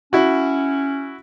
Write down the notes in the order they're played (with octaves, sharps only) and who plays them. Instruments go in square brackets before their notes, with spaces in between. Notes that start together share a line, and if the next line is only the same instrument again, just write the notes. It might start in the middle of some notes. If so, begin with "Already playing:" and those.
[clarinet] C#4 [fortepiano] E4 F#4